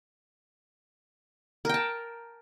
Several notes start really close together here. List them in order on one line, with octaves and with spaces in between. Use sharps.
A#4 G5 A5